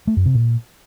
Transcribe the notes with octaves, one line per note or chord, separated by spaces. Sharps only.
A3
F#2
C3
A#2